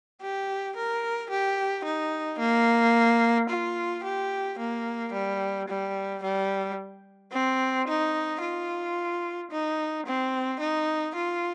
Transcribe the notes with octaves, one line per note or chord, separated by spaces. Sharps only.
G4
A#4
G4
D#4
A#3
F4
G4
A#3
G3
G3
G3
C4
D#4
F4
D#4
C4
D#4
F4